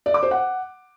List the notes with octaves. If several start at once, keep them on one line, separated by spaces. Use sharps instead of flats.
D5
D6
C5
F#5